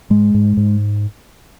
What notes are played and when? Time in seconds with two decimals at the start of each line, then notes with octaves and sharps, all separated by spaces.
0.10 G#2 G#3
0.34 G#2
0.57 G#2